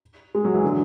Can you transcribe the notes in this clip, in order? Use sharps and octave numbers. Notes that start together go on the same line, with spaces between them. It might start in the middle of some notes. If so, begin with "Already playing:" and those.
G#3
F#3
E3
D3